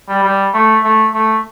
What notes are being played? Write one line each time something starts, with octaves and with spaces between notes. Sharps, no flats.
G3
G3
A3
A3
A3